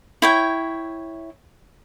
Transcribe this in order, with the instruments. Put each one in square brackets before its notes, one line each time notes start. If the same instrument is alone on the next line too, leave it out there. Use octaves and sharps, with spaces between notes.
[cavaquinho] E4 C#5 G5